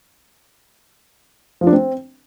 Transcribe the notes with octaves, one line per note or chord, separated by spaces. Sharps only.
F3
D4
C4